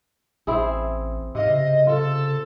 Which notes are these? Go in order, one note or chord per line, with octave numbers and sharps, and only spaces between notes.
A1 C4 E4 G#4
G#2 C3 D#5 F5
C#3
F4 A4